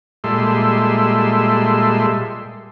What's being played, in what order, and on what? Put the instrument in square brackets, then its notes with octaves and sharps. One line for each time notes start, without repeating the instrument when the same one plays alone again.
[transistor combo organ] A#2 G3 G#3 A4 E5 C6